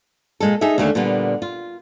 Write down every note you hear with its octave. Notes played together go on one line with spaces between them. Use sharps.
A#2 G#3 A4
D#4 G#4 A4 E5
D#2 D3 A3 A#3 C#4
A#2 D3 G3 B3 F4
F4